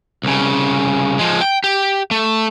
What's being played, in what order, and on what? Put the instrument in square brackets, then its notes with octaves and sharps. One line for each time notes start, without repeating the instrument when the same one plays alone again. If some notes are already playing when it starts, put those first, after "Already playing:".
[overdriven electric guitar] C2 C#3
F3 G#3
G5
G4
A3